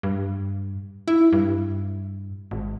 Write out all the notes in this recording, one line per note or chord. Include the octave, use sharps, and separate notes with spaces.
G2
E4
G2
G#1